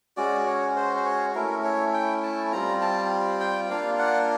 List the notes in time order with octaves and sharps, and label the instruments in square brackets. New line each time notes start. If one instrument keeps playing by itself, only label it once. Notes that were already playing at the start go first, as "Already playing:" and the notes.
[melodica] G#3 C#4 F#4 D5
C#5
C5
C5
C#5
A3 C#4 E4 A#4
C#5
G5
A5
G3 C4 F4 A#5
A5
G5
A#3 D4 F4 F5
F#5